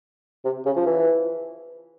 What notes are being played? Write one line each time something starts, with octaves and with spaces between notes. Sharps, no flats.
C3
C#3
F3
E3